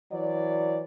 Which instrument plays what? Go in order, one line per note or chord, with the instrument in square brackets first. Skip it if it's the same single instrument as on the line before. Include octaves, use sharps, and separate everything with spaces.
[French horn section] E3 F#3 D5